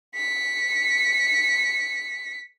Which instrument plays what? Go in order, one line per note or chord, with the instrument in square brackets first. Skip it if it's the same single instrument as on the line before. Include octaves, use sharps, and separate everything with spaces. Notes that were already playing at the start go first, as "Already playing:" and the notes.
[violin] B6 C#7